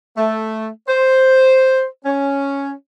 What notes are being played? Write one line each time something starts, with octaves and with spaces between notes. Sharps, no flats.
A3
C5
C#4